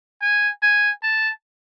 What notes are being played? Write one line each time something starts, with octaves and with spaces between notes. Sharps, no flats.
G#5
G#5
A5